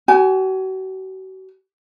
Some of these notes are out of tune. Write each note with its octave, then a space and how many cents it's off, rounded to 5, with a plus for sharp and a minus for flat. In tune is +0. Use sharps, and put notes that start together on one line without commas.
F#4 +40 G#5 +10